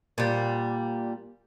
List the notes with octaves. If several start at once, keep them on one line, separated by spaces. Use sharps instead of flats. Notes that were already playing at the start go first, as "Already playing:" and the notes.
A#2 G3